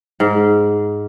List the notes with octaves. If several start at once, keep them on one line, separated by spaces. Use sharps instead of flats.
G#2